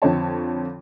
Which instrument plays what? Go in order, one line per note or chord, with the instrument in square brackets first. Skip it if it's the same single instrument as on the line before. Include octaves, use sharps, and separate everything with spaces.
[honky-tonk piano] F2 D3 C4 C#5 A5